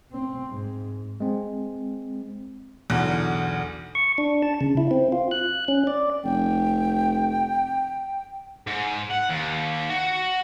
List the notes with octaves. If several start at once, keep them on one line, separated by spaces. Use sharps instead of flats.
C4
G#2
G#3 C4
B1 E2 D3 F#6
C#6
D4
A5
C#3
E4
C4
F4
F#6
C#4
D5
F1 G5
G#2
F#5
D#2
F#4